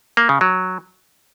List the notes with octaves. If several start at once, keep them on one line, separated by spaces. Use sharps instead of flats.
A#3
C#3
F#3